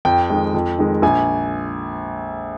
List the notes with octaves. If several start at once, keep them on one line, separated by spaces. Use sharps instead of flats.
F2 G5
D#3 G#3
F2
D#3 G#3
A#1 G#5